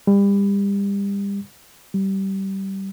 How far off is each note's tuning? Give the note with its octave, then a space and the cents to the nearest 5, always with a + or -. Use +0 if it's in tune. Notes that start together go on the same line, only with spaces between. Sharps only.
G3 +30
G3 -20